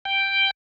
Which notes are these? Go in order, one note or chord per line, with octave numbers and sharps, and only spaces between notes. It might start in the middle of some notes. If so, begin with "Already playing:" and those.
G5